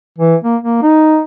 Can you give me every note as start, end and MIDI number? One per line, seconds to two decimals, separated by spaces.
0.18 0.35 52
0.44 0.56 58
0.62 0.82 58
0.82 1.20 63